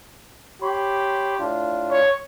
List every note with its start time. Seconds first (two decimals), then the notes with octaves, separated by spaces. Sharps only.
0.62 G4 C#5 B5 C6
1.39 A2 D4 F4
1.91 C#5